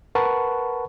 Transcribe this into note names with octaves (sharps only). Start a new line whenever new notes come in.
A#4 B4 F#5 A5 B5 C#6